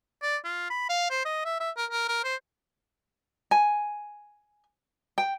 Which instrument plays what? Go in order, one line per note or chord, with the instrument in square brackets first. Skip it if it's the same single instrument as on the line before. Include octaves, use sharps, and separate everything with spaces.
[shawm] D5
F4
B5
F5
C5
D#5
E5
E5
A#4
A#4
A#4
C5
[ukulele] G#5
G5